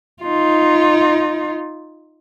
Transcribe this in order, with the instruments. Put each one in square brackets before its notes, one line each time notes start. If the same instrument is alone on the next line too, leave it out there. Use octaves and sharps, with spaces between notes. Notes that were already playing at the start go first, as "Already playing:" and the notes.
[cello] D#4 F4